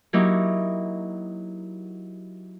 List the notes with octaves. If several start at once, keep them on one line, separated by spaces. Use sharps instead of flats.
F#3 A#3 D#4 E4 G4